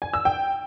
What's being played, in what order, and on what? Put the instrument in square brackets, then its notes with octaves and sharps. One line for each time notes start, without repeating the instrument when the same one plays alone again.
[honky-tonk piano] G#5
E6
G5